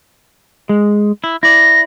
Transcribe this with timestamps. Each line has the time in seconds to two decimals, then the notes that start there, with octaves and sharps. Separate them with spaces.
0.69 G#3
1.24 E4
1.43 E4 D5 A#6